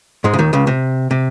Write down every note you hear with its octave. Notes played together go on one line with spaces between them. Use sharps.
G#2 G#3
C#3
D#2 D#3
C#2 C#3
C3
C3